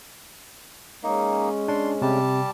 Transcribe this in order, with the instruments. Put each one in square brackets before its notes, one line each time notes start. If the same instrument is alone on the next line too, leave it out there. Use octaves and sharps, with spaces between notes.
[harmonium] G#3 C#4 [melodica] A#3 D#4
[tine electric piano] D4 [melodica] C6
[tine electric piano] C3 [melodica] G3 G4 A5